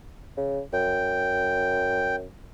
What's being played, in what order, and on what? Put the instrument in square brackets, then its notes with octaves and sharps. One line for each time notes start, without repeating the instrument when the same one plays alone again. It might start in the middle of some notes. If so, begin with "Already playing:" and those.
[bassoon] C#3
[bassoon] F#2 [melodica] G5